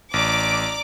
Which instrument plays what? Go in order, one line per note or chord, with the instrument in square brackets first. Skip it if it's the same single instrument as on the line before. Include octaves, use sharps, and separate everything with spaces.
[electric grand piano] A1 [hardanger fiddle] D5 A#5 [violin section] D6